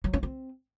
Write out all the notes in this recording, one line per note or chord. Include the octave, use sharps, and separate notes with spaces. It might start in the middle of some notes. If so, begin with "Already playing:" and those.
F#3
C#4
C4